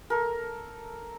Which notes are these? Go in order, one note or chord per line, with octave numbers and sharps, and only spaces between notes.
A4 A#4